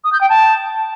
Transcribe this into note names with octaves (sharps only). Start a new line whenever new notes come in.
D#6
G6
G5
A5